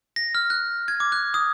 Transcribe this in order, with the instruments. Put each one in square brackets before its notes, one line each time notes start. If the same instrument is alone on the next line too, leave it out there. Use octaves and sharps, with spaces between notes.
[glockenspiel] A#6
F6
F#6
G#6
D6
F#6
D#6